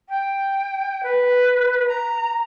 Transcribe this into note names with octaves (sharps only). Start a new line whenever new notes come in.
G5
B4
A#5